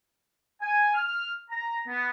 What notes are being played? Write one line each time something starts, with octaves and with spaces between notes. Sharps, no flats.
G#5
F6
A#5
B3